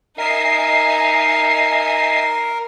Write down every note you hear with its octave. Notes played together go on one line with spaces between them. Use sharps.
D#4 A#4 D#5 E5 G#5 C7